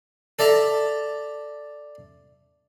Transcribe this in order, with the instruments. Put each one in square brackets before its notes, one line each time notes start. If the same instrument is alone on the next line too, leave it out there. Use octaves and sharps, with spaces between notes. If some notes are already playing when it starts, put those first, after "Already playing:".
[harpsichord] A4 D5 E5 A5 A#5